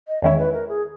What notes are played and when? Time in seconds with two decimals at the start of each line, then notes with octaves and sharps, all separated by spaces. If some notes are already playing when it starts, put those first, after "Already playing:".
0.08 D#5
0.22 E2 D#3 G#3 C#4 E4 C#5
0.38 B4
0.53 A#4
0.69 G#4